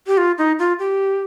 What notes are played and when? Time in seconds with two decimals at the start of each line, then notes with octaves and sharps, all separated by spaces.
0.07 G4
0.18 F4
0.38 D#4
0.59 F4
0.79 G4